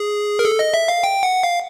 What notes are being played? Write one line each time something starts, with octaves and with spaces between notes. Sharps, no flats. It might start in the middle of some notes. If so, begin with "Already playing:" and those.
Already playing: G#4
A#4
A4
D#5
E5
F5
G5
F#5
F5